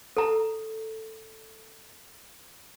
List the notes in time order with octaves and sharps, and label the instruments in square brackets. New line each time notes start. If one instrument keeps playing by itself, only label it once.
[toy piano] A4 A#5